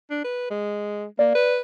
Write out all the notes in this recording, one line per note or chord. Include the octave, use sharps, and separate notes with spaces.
D4
B4
G#3
A#3 D5
B4